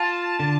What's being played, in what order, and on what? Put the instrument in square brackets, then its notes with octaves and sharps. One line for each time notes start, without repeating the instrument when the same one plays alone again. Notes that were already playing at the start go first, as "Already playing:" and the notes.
Already playing: [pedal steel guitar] F4 [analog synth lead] A5
[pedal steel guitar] D3